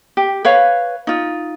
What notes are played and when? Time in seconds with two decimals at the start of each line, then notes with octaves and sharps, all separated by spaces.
0.17 G4
0.45 B4 C#5 F5
1.07 D#4 F4